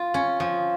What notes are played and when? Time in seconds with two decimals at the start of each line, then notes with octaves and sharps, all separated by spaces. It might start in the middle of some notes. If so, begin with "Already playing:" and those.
Already playing: F4
0.14 C#4
0.40 F3